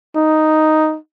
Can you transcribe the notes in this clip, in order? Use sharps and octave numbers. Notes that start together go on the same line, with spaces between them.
D#4